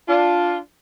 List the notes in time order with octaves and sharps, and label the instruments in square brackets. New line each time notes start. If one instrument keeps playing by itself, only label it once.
[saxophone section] D4 F4